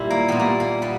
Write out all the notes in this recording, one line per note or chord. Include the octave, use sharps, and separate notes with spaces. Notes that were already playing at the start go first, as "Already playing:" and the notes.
Already playing: A#2 G3 E4
A#3
A#2 G3 B3
A#3
A#3
G3 B3